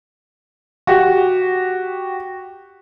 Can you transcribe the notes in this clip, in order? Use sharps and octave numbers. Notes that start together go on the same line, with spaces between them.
F#4 G4